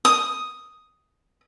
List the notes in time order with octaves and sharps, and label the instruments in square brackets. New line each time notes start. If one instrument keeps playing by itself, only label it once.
[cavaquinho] D#6